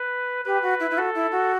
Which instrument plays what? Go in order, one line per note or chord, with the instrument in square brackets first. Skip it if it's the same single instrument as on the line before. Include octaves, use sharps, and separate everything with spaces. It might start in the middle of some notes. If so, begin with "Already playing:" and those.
Already playing: [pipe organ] B4
[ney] G4 [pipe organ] B4
[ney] F#4
E4
E4
[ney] F#4 [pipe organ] A4
[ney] E4
F#4